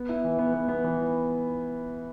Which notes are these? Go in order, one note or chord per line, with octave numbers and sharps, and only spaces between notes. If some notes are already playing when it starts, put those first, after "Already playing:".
Already playing: B3
E4
E3
B3
B3
B3
E3